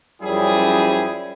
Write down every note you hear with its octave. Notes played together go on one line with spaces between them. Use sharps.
F#2 F3 G3 C#4 E4 G#4